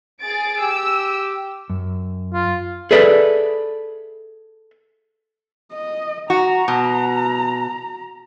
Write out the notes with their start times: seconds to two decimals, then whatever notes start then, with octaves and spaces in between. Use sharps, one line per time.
0.22 G#4 A6 D7
0.62 G4 E6
1.70 F#2
2.34 F4
2.91 G#4 A4 B4 D5 E5
5.73 D#5
6.30 F#4 A#5
6.68 B2